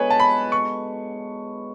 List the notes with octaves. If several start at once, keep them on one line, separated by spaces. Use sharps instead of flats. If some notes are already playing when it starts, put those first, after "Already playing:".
Already playing: D3 G#3 B3 F#4 B4 C#5
A5
B5
C#6